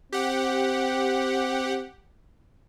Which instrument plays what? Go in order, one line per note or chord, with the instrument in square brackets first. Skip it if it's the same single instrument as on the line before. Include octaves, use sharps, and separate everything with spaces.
[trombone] C4 [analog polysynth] G4 F#5